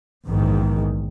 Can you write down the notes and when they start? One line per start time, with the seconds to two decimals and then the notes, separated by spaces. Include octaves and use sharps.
0.24 A#1 E2 G#2 D#3